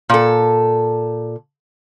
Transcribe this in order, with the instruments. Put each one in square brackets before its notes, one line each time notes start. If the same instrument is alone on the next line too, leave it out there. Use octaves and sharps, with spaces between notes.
[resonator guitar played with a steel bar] A#2 A4